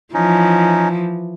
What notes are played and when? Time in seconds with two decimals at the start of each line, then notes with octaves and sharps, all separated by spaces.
0.14 E3 F3 C#4 D#4